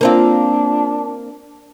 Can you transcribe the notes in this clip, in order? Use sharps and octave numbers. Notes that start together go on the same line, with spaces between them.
A#3 C4 D4 F4